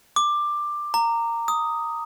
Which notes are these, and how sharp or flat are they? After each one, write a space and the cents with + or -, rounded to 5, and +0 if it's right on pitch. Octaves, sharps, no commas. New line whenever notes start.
D6 +15
A#5 -15
D#6 +5